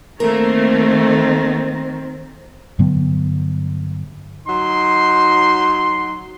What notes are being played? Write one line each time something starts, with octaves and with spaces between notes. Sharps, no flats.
D#3 A3 A#3 C4 A#4
G2 D3 F#3 B3
F#3 D#4 C6